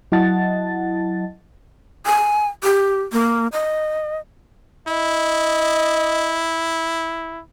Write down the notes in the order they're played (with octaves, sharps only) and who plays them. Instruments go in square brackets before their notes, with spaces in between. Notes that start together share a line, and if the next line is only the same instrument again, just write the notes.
[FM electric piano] F#3 E4 D#5 F#5 A5 A6
[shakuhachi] G#5
G4
A#3
D#5
[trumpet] E4 [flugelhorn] D#5